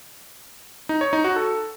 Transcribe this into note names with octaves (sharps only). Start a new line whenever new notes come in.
D#4
C#5
D#4
F#4
A4